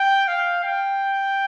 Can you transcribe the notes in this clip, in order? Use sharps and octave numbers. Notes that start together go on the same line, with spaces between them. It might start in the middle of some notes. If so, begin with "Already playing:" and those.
Already playing: G5
F5
G5